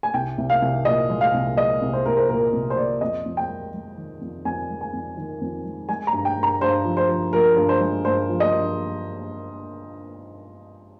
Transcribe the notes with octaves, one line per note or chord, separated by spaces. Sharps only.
G#5
C2 G5
C2
F5
C2
A#2 D#5
G#3
F5
C2
G#3 D#5
C2
C5
C2 A#4
C5
A#2 A#4
C2
C5
A#2 D5
F2 D#5
F2
G5
G#3
G#3
D#3
F2
F2 G#5
G#3
G#5
F2
D#3
F2
G#3
G#3 G#5
A#5
G2
G5
G2
A#5
G2 C5
F3
C5
F3
F3 A#4
G2
C5
G#3
G2 C5
F3
D#5
G2